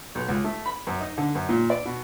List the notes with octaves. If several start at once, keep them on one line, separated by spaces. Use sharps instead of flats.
B1
C#2
A3
B5
F#2
D#4
D3
F#2
A#2
D5
B2